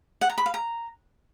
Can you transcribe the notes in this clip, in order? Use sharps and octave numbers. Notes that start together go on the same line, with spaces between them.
F#5
A#5
B5
F5
A#5